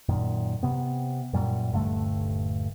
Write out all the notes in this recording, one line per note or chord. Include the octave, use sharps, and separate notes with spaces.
F#2 A#2 D#3
C3 B3
F#2 A#2 G3
D#1 G2 D3 A3